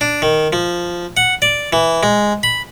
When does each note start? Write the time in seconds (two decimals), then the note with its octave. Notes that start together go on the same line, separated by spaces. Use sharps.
0.01 D4
0.22 D#3
0.53 F3
1.17 F#5
1.42 D5
1.73 E3
2.03 G#3
2.43 B5